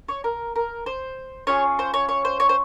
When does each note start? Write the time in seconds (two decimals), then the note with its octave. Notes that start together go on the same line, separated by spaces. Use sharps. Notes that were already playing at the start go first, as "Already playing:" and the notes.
0.09 C#5
0.24 A#4
0.56 A#4
0.86 C5
1.47 C#4 F4 G#4 C#5
1.79 C5
1.94 C#5
2.09 C#5
2.25 C5
2.40 C#5
2.49 C5